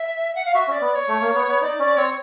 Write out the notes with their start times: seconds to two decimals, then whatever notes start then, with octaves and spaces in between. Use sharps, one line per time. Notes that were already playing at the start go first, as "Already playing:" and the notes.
Already playing: E5
0.35 F#5
0.45 F5
0.54 F#4 E5
0.68 C#4 D5
0.81 B3
0.91 D5
0.95 C#5
1.08 A3
1.21 A#3
1.35 B3
1.48 B3
1.61 D#4 D5
1.79 C#4 D5
1.97 C4 C#5